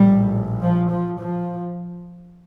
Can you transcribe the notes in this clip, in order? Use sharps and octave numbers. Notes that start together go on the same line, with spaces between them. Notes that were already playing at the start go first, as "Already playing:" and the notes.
Already playing: A#1 A2 G3
F3
F3
F3